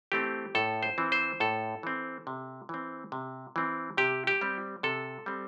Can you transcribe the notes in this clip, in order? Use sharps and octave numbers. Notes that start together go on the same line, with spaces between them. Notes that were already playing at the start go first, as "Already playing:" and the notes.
E3 A3 C4 G4
A2 A4
C5
E3 C4
C5
A2 A4
E3 C4
C3
E3 C4
C3
E3 C4
C3 G4
G4
G3 C4
C3 A4
G3 C4